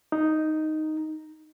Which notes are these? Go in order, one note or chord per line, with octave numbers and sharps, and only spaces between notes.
D#4